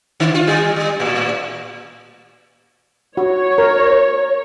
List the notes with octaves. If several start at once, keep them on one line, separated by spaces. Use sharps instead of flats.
D3
F4
G3
G3
A2
F#4 C#5
A#4